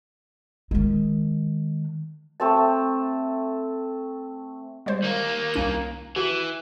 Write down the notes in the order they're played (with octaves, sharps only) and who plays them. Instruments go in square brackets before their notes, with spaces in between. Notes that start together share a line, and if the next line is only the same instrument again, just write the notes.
[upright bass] D#3 G#3
[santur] A3 C4 A5
[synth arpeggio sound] G3 G#3 C5
[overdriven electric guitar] D#2 A#3
[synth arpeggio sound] C2 C#4 D#7
[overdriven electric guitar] E3 [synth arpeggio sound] F#4